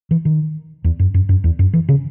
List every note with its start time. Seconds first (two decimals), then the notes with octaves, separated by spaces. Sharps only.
0.11 E3
0.25 D#3
0.84 E2
0.99 F#2
1.14 F#2
1.29 F#2
1.44 E2
1.59 F#2
1.74 E3
1.89 C#3